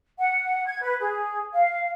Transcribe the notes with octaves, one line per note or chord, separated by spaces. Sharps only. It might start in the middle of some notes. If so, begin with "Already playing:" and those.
F#5
G#6
B4
G#4
F5